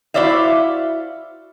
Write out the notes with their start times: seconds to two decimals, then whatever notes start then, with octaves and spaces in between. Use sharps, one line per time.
0.14 E4 F#4 C5 D5 E5 F5